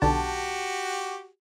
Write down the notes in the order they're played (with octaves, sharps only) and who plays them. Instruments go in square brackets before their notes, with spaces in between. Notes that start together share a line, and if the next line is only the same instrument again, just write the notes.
[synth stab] B1 D3 A5 [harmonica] F#4 G4